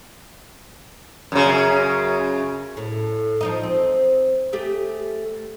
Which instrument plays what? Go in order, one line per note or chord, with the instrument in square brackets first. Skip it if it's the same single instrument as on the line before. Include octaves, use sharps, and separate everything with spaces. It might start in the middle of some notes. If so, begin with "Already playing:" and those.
[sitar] F#2 C#3
[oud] A2
F3 D#4 D#5
C4
A3 G4 G#4